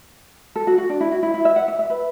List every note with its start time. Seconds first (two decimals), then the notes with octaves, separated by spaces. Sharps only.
0.56 A4
0.67 F#4
0.78 F#4
0.90 D4
1.00 E4
1.12 F#4
1.23 E4
1.34 E4
1.45 E5
1.56 F#5
1.68 E5
1.79 E5
1.90 B4